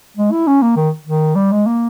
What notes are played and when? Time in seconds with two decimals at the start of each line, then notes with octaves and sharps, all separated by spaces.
0.17 G#3
0.32 E4
0.47 C#4
0.62 A#3
0.77 D#3
1.06 D#3
1.36 G3
1.52 G#3
1.67 A#3